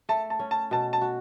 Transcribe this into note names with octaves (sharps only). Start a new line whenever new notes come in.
A3 A5
A5
C#4
A5
B2 A5
A5
F#4